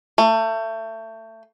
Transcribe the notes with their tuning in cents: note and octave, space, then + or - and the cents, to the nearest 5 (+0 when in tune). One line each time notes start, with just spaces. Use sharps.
A3 +25